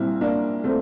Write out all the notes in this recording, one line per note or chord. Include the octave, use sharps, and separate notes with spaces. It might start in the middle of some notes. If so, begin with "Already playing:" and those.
Already playing: C2 A#2 C4 E4
A#3 D4
A3 C4